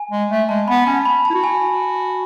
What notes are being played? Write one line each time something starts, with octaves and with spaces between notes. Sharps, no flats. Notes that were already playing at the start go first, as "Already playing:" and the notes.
Already playing: G#5
G#3
A3
G#3 A5
B3 B5
C#4 A5
B5
E4 A5
F#4
G#5